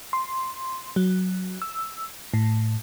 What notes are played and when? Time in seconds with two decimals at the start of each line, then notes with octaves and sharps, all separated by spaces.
0.13 C6
0.96 F#3
1.62 E6
2.34 A2